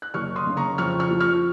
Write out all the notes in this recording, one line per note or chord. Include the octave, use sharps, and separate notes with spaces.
F#6
F#1 C#6 F6
C6 D#6
C#3
A#5 C#6
F2 C#6 F6
C#6 F6
F3
C#6 F6